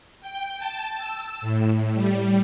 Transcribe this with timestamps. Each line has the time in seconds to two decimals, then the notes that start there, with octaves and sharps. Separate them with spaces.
0.21 G5
0.58 A5
0.97 E6
1.41 A2
1.94 G3